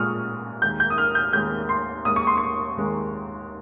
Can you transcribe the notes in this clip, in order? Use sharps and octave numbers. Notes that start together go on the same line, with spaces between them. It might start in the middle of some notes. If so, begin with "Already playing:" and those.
Already playing: A#2 G#3 C#6 D#6 F6
D#2 D#3 G#3 G6
G6
D#6
F6
G6
D#2 D#3 G#3 G6
C6
D#2 D#3 G#3 D#6
C#6
C6
C#6
D#2 D#3 G#3